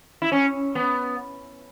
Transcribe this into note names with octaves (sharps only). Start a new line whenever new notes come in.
E4
C#4
B3